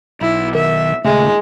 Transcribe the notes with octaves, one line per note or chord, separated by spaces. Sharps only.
B1 E4
D#3 E5
D#1 C#3 G#3 A3